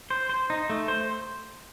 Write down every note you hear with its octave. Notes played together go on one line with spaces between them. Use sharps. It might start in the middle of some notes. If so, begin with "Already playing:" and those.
C5
C5
D#4
A3
C5